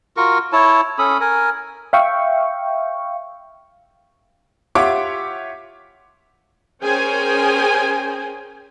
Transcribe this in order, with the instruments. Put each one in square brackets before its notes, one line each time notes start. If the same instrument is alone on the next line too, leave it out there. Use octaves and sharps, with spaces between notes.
[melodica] F4 F#4 A#4 C#6
E4 C#5 A5
C#4 A4 B5 D#6
A#4 G#5
[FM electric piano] E5 F5 G5 C#6
[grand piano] F4 G4 C#5 E5 F#5 D6
[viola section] C#4 G#4 A#4 C5 G5 G#5